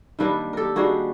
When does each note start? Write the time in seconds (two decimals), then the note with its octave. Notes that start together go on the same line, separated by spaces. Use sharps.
0.19 D#3 G3 A#3 D4 A4 B4
0.53 G4 A4 A#4
0.76 D#3 G3 A#3 D4 F#4 G#4